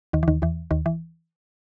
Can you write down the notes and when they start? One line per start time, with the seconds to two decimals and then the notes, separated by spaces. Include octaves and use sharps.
0.13 D#2 D#3
0.23 E3
0.28 D#2 D#3
0.42 E2 E3
0.71 D#2 D#3
0.86 E3